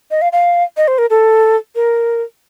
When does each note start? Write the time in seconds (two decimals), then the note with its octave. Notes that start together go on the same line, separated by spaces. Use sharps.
0.11 D#5
0.22 F5
0.33 F5
0.77 D#5
0.88 C5
0.98 A#4
1.10 A4
1.75 A#4